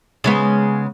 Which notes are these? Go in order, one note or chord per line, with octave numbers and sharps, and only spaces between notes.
C#3 G#3 B3